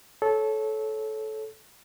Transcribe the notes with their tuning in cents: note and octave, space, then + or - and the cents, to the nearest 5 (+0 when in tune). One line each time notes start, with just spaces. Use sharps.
A4 -20 C#5 +0